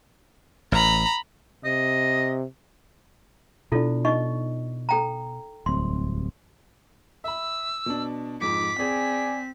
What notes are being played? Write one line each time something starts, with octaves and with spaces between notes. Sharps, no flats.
A1 A#5 B5
C3 D#5
B2 D4 E4 F4 A4
D#4 D#5 C#6
A4 G5 A#5
D1 C2 C3 C6
E5 B5 E6
B2 D4
F2 G#2 D6 B6
C4 G#4 D5 G#5